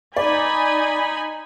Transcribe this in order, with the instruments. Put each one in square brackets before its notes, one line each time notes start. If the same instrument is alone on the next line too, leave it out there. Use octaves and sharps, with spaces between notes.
[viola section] D#4 G#5 B5 [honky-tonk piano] D5